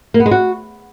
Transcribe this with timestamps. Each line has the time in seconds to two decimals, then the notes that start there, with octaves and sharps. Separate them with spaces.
0.14 A#3
0.20 B3
0.26 G#3
0.31 F#4